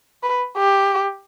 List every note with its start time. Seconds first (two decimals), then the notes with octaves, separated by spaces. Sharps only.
0.23 B4
0.57 G4